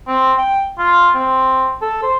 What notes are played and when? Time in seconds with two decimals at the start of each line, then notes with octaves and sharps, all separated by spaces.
0.07 C4
0.38 G5
0.78 F4
1.15 C4
1.82 A4
2.03 C5